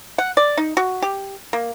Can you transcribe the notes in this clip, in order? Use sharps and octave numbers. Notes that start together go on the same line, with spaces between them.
F#5
D5
D#4
F#4
G4
A#3